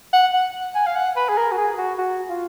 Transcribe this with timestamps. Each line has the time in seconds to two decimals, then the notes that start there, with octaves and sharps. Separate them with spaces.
0.13 F#5
0.33 F#5
0.75 G#5
0.86 F5
0.96 F#5
1.17 B4
1.29 G#4
1.37 A#4
1.52 F#4
1.58 G#4
1.78 F#4
1.98 F#4
2.30 F4